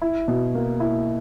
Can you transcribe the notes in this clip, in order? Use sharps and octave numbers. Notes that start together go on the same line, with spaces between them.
E4
B2
A#3
E4